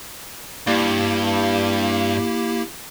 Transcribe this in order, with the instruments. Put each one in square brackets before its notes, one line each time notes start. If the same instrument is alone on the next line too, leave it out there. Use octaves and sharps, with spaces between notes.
[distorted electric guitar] G2 [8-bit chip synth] A#3 E4 G4